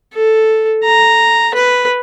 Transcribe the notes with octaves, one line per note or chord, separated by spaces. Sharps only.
A4
A#5
B4